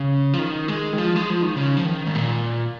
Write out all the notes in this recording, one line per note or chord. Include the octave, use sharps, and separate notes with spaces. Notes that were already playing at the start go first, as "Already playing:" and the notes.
Already playing: C#3
F3
D#3
G#3
D#3
F3
G#3
F3
D#3
C#3
F3
D#3
G#2
A#2